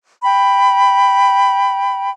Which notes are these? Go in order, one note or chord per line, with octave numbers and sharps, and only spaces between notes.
G5 B5